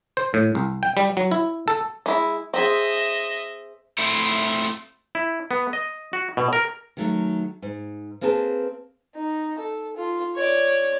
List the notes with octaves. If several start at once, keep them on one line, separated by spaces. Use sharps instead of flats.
C5
A2
C2
G5
G3
F#3
E4
A4
G#3 E4
C4 G#4 D#5 E5
A3 C4 E4
E4
B3
D#5
F#4
B2
A#4
D#3 F#3 A3
G#2
A#3 C4 G#4 B4 G5 A5
D#4
A4
F4
C#5 D5